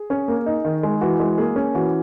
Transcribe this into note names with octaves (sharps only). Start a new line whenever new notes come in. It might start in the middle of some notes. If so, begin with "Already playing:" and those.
Already playing: G#4
C#4
A#3
D#4
D#3
G#3
E3 F#4
G#3
A#3 G#4
C#4
E3 F#4